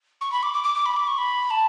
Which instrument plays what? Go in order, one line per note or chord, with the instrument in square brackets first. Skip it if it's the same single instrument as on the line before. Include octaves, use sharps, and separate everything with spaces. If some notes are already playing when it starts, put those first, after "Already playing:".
[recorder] C#6
B5
D6
D6
D6
D6
B5
D6
C#6
B5
A5